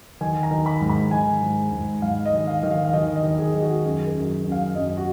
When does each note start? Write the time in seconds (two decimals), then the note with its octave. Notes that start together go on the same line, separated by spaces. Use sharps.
0.21 D#3 G#5
0.43 A#5
0.51 D#3
0.66 B5
0.81 G#2
0.89 B5
1.11 D#3 G#5
1.42 G#2
1.72 G#2
2.02 G#2 F5
2.26 D#5
2.33 D#3
2.47 F5
2.63 D#3
2.71 F5
2.85 F5
2.93 D#3 D#5
3.16 D#5
3.23 D#3
3.38 G#4
3.54 D#3
3.62 F#4
3.84 F#2 G#4
4.06 A#4
4.15 F#2
4.44 F#2
4.52 F5
4.75 F#2 D#5
4.98 F#4